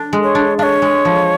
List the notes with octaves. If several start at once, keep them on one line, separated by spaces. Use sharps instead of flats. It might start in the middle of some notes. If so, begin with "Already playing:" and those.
Already playing: D4
G#3
C#5
D4
D4 C#5 F5
G#3
F3